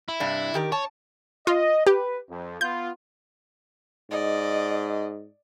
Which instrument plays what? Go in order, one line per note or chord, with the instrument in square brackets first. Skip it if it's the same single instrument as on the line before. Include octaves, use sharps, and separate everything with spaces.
[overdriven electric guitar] E4
[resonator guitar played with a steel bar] G2 C3 D4
D#3 G4 A#4
[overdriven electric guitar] C#5 [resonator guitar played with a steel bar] A5
[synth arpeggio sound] F4 [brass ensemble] D#5
[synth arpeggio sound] G4 [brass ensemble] B4
[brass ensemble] F2
[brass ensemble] B3 F4 [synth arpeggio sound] G6
[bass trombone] G#2 [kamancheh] D5 D#5